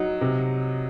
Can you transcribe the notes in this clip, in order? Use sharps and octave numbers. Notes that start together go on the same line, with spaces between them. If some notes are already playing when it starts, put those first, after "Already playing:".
Already playing: F#3 D#4
C3